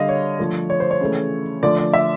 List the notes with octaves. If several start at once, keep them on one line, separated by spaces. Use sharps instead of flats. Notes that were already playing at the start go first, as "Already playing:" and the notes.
Already playing: D3 G3 D#5 F5
C#5
D3 F3 A3
C#5
C5
C#5
C#3 E3 A3
D3 F3 A3 D5
D5
E5